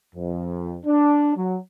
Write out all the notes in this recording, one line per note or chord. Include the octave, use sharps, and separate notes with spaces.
F2
D4
F#3